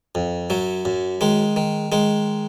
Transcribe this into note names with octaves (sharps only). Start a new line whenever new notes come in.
F2
F#2 F#3
F#2
D#3 G#3
D#3
D#3 G#3